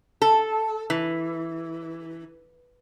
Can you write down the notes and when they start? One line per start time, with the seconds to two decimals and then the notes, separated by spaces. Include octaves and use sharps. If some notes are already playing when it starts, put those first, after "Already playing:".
0.22 A4
0.90 E3